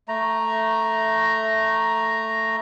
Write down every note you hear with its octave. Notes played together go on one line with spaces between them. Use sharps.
A3 A#5